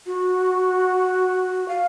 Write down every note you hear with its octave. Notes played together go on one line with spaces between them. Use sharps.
F#4
F5